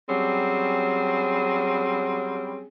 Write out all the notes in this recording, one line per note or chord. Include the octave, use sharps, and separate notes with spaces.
F#3 G3 C4 C#4 G#4